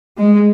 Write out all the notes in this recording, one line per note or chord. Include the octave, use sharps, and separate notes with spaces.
G#3